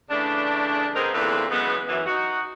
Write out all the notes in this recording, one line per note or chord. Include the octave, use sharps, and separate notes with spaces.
C#3 E3 A3 D4
C3 B3 C4 D#4 G#4 A#4
E2 A#2 D3 A3 C4 B4
C#3 E3 F#3 G#3 B3
F#2 E3
D#4 F#4